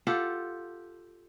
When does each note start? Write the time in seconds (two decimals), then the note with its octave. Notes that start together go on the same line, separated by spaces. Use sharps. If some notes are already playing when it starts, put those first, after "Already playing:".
0.07 F4 G4 A4 F#5